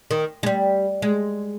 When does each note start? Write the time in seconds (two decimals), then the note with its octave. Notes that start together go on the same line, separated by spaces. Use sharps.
0.11 D#3
0.43 G#3
0.46 G3
1.02 G#3